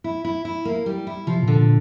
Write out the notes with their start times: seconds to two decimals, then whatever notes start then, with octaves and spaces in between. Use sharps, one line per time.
0.04 E4
0.25 E4
0.45 E4
0.65 A#3
0.86 G3
1.07 E4
1.27 C3 F3
1.43 A#2 D3
1.58 A#2